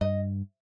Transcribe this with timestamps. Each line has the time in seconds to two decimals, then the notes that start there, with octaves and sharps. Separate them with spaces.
0.01 G2 D#5